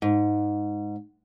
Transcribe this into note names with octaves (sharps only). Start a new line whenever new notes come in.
G#2